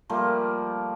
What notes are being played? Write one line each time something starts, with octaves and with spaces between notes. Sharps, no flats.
F3 G3 A3 A#3